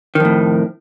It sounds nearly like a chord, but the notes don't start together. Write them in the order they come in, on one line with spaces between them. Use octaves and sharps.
D#3 F2 A2